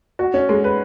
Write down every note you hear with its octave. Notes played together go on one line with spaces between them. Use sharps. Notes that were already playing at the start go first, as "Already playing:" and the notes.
F#4
C#4
G#3
B4